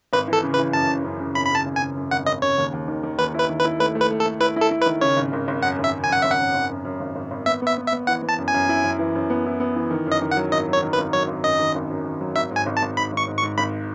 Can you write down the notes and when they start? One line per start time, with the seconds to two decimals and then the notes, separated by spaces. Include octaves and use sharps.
0.13 G#1 B4
0.28 E3 A4
0.43 C#3
0.54 B4
0.58 E3
0.73 F#2 A5
0.89 F#2
1.04 F#2
1.20 C#3
1.35 G#1 B5
1.46 B5
1.51 C#3 A5
1.66 G#1
1.76 G#5
1.81 C#3
1.96 F#2
2.11 G#1 F#5
2.26 G#1 D#5
2.42 C#3 C#5
2.58 D#2
2.73 D#2
2.88 D#3
3.03 D#3
3.18 D#2 B4
3.34 E4
3.39 B4
3.49 D#3
3.59 B4
3.65 E4
3.79 A3 B4
3.95 A3
4.00 B4
4.11 A3
4.20 A4
4.26 A3
4.40 E4 B4
4.56 E4
4.61 A4
4.71 E4
4.82 B4
4.86 D#3
5.01 C#3 C#5
5.17 G#1
5.33 G#1
5.48 G#1
5.63 F#2 F#5
5.79 G#1 E5
5.93 C#3
6.04 G#5
6.09 F#2 F#5
6.22 G#1 E5
6.31 F#5
6.40 F#2
6.54 G#1
6.70 F#2
6.85 F#2
7.00 G#1
7.16 G#1
7.31 G#1
7.46 B3 E5
7.62 B3
7.67 E5
7.78 B3
7.87 E5
7.92 B3
8.07 E3 F#5
8.22 B3
8.29 A5
8.38 F#2
8.48 G#5
8.54 F#2
8.69 E4
8.84 F#2
8.99 E3
9.15 F#2
9.30 B3
9.46 E4
9.60 B3
9.76 E3
9.91 D#3
10.06 F#2
10.12 D#5
10.22 D#3
10.31 F#5
10.37 F#3
10.52 G#1 D#5
10.68 F#3
10.73 C#5
10.83 D#3
10.93 B4
10.98 G#1
11.13 F#3 C#5
11.28 G#1
11.44 F#2 D#5
11.59 D#3
11.75 G#1
11.90 F#2
12.05 D#3
12.21 F#3
12.36 G#1 E5
12.51 G#2
12.56 G#5
12.66 G#1
12.77 A5
12.82 G#1
12.97 G#2 B5
13.12 G#1 C#6
13.27 G#2
13.38 C#6
13.43 G#2
13.58 G#1 B5